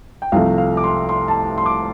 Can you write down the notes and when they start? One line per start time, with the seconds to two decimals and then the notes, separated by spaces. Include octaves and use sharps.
0.22 G5
0.32 C2 C3 F3 A3 F5
0.58 F5
0.77 D6
0.84 C6
1.09 C6
1.28 A5
1.58 C6
1.66 D6